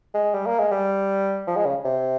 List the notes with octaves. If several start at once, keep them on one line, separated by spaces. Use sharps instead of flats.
G#3
G3
A#3
G#3
G3
F3
G#3
C#3
C3